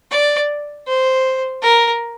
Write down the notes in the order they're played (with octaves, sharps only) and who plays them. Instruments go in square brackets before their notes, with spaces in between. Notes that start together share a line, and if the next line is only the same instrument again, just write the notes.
[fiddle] D5
C5
A#4